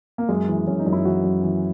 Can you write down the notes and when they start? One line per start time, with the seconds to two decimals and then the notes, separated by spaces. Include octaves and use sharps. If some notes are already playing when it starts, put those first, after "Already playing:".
0.18 A#3
0.29 F#2 G#3
0.48 E3
0.67 F#2 C#4
0.79 D#4
0.86 F#2
0.93 E4
1.05 E3 F#4
1.24 F#2
1.43 E3